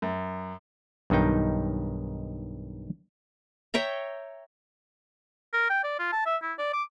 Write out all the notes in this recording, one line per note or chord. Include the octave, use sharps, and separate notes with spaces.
F#2
B1 G2 D#3 D#4 G5
C#5 E5 G5 A#5
A#4
G5
D5
F4
A5
E5
E4
D5
D6